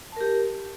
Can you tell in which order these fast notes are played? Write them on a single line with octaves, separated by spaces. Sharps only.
A5 A#4 G4